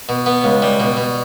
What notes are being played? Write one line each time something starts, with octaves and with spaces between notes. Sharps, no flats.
B2
B3
C#2
G3
B2
B2